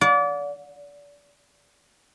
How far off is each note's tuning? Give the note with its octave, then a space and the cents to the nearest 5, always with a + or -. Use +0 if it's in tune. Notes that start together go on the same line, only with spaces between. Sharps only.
D5 -30 F#5 -45